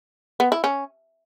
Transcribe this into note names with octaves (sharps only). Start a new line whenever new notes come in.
B3
E4
C#4